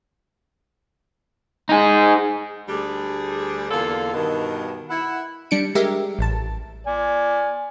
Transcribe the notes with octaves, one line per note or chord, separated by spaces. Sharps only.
D#4 G#4
D2 G3 D4 G#4
E2 D3 A#3 F4 A4
G2 B2 D#3
E4 F#5
G3 D4 C#7 D7
G#3 G4 A#4 E5
A1 A5
D5 G#5